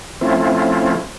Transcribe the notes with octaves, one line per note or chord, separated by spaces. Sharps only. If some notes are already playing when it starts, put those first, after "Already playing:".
F3 A3 C4 C#4 E4 F4